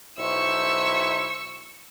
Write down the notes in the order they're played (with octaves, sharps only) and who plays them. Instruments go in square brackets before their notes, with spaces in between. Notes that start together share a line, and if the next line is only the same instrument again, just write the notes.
[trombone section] B1 E4 C5 [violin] C#6 E6